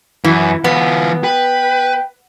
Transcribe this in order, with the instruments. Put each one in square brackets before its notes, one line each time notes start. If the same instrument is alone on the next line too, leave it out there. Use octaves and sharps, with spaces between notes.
[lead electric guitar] F#2 [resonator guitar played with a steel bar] E3
[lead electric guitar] E3 F4 [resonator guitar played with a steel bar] B3
[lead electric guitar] B4 [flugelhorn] G5